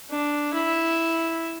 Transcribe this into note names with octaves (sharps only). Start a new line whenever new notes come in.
D4
E4